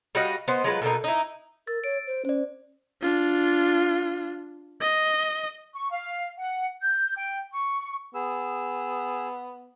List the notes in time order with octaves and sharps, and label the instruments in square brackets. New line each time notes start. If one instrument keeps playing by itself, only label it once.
[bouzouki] G3 F#4 D#5 F5
B3 C5 D#5
F#3 G#3 F4 B4
B2 A3 A#3 D#4
D#4 E4
[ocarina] A#4 [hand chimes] E6 A6
[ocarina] C#5 [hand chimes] D7
[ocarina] C5
[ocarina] C#4 [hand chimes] C5 D5
[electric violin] D4 F4
D#5
[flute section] C#6
F5
F#5
G6
G5
C#6
[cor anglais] B3 [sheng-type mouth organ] G#4 E6